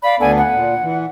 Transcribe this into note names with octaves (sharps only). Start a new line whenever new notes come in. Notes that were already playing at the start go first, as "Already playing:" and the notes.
D5 F5 B5
D2 B3 D4 A4 D5 G#5
F#5
A#2
E3